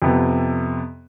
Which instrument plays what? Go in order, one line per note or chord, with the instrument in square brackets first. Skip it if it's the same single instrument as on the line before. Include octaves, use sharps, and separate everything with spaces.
[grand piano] F2 C3 B3